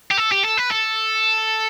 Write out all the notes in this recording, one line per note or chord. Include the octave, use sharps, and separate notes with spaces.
G4
A4
G4
A4
B4
A4